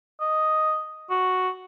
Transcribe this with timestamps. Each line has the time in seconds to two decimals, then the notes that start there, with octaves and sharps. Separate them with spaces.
0.21 D#5
1.10 F#4